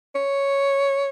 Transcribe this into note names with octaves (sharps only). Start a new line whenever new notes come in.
C#5